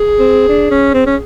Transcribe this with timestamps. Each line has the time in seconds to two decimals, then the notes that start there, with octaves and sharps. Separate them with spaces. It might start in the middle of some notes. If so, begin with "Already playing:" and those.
Already playing: G#4
0.19 C4
0.49 D4
0.71 C#4
0.94 C4
1.06 C#4